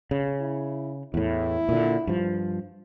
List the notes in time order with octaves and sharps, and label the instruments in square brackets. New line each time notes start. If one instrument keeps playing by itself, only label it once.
[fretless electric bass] C#3
[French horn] E4
[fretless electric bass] E2 A2 [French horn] E4
[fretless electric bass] A#2 D3
G2 F3